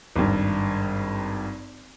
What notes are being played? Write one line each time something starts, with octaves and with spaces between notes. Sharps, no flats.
G#1 G2